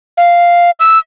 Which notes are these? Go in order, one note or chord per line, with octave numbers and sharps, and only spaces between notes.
F5
E6